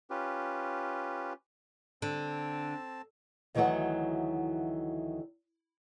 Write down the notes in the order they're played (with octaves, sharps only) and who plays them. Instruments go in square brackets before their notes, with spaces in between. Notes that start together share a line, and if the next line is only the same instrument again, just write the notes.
[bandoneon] C#4 F4 G4 B4
[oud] D3 [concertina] C4 A5
[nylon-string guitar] D2 D#3 E3 F#3 C#5 F#5